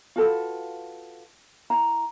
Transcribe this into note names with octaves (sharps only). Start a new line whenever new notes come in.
F4 F#4 A4 B4
E4 A#5